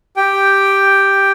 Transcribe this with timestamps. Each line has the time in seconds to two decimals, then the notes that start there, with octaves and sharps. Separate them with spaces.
0.17 G4 G5